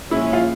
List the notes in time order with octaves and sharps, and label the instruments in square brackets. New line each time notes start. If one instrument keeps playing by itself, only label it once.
[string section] A#2 F3 G#3 C#4 [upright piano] E4
[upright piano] F4